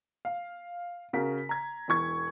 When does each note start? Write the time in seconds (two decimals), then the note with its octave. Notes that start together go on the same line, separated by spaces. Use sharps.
0.25 F5
1.13 C#3 F#4 A#4 B6
1.49 A#5 G#6
1.88 E1 E3 C#6 G#6